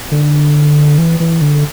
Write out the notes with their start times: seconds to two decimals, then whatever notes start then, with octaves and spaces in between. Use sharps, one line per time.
0.11 D3
0.98 E3
1.20 E3
1.41 D3